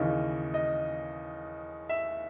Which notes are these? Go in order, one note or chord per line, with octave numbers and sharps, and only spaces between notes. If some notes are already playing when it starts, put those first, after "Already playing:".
Already playing: D#2 C#3 E3 D#5
D#5
E5